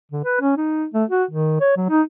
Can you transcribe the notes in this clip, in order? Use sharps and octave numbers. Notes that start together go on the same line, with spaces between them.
D3
B4
C#4
D#4
A3
F#4
D#3
C#5
F#3
D#4